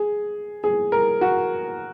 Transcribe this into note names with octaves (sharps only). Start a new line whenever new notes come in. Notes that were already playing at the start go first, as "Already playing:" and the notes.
Already playing: G#4
G#4
A#4
F#4